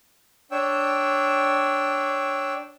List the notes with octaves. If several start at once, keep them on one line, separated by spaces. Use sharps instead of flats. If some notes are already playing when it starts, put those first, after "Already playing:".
D4 C#5 G5 E6